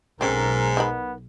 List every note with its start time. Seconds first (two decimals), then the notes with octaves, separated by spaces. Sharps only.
0.21 B1 G#2 C4 C#4 A4 A#4
0.77 B3 D#4 A#4 B5